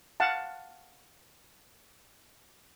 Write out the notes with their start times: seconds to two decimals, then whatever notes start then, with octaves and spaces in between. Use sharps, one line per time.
0.20 F5 F#5 A5